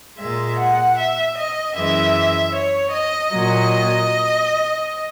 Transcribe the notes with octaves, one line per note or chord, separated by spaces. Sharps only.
A#2 G#3 E5
F#5
E5
D#5
F#2 E3 G#3 E5
C#5
D#5
A#2 F#3